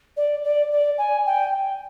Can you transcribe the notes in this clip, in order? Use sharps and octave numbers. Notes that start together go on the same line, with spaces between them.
D5
D5
D5
G#5
G5